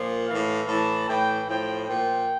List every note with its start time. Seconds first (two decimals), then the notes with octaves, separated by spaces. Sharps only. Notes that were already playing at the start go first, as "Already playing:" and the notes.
Already playing: A#2 F3
0.28 A2 E3 F5
0.67 A2 E3 A5
1.08 A2 E3 G5
1.47 A2 F3 G5
1.87 A#2 F3 G5